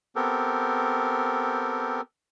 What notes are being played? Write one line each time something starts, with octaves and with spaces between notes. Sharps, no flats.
B3 C4 G4 A4 A#4